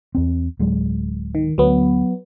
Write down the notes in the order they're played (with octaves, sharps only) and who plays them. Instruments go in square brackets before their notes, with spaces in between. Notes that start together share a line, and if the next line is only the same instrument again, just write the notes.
[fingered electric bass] E2 C4
D1 F#3 G#3
[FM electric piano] D#3
[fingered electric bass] D2 [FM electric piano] F#3 B3